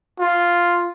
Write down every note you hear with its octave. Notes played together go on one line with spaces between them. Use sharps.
F4